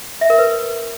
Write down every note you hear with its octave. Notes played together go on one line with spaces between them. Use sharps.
E5
A#4
B4